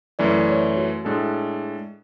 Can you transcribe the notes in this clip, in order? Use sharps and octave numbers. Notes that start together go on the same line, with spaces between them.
F#2 E3 A3 D5
C#5
F#4
A2 G#3 D4 A4